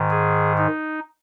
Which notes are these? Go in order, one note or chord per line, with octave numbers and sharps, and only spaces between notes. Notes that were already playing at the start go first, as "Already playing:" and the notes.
Already playing: G#2 D#3
G#4
D#4